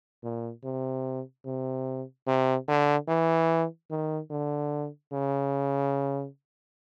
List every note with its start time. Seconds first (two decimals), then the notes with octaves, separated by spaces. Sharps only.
0.23 A#2
0.64 C3
1.46 C3
2.27 C3
2.68 D3
3.08 E3
3.91 D#3
4.31 D3
5.12 C#3